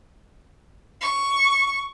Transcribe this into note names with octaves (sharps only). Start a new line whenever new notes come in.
C#6